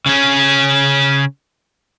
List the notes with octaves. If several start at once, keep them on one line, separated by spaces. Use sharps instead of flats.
C#3 C#4